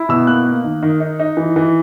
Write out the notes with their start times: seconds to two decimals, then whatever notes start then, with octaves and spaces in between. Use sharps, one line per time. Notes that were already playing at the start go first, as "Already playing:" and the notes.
Already playing: E4
0.09 B2 E6
0.27 A#3 F#6
0.46 A#3
0.64 D#3
0.83 D#3
1.00 D#4
1.20 D#4
1.37 E3
1.56 E3